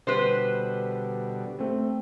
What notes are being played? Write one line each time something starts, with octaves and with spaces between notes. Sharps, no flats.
B2 D3 G3 B4 C5
A3 C4